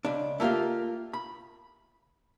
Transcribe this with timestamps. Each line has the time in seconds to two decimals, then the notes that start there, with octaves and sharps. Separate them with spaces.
0.05 C#2 D4
0.40 A3 A#3 F4 G4 F5
1.13 B5